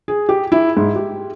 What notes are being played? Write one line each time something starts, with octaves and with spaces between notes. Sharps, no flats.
G#4
G4
E4
G#2
G4